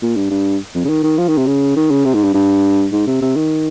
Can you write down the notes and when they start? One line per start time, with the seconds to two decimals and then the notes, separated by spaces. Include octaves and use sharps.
0.02 A#2
0.16 G2
0.31 G2
0.74 F2
0.84 C#3
0.89 D#3
1.03 D#3
1.18 F3
1.28 D#3
1.38 C3
1.47 C#3
1.76 D#3
1.91 C#3
2.05 C3
2.15 G#2
2.24 G2
2.34 G2
2.93 G#2
3.07 C3
3.21 C3
3.36 D#3